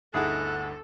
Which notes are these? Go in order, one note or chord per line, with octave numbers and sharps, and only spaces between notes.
G1 D2 D#4 E4 G#4 A4 F#5 F#6